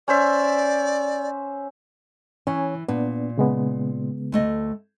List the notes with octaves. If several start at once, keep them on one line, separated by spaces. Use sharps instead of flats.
C#4 C5 D5 E5
E3 C#4 C#5 G#5
A#2 B3 D4
C#3 G#3 B3
D2 A3 D#5